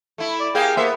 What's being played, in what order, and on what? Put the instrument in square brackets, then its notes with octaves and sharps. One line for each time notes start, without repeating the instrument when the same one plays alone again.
[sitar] A3 E4
[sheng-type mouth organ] D5
[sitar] A#3 G4 G#4 [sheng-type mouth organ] F5 G5 G#5
[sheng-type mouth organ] A#3 C5 C6 [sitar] B3 E5